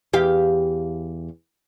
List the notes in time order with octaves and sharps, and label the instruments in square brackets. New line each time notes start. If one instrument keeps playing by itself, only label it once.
[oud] E2 G4 F5